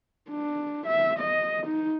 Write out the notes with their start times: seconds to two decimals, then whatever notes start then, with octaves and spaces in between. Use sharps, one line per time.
0.30 D4
0.87 E5
1.19 D#5
1.67 D#4